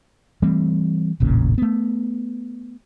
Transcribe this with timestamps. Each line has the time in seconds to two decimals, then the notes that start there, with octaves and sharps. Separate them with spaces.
0.42 E3 G3 A3 C4
1.20 E1 A1 A#2 C#3
1.58 A3 B3